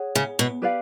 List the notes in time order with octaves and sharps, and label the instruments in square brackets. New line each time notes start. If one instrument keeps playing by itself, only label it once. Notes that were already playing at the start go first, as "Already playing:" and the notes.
Already playing: [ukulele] G#4 C#5 F#5
[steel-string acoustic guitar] C#3
B2
[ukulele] G4 B4 D5 F5